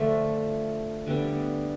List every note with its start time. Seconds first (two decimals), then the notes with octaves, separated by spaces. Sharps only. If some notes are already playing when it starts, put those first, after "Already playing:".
Already playing: D3 F3 A3 D4
1.06 D3 G3 B3 D4